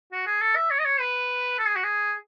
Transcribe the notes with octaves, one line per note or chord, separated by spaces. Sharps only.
F#4
G#4
A4
E5
C#5
D#5
C#5
B4
A4
G#4
F#4
G#4